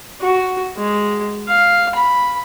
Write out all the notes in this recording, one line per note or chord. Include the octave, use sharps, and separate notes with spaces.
F#4
G#3
F5
B5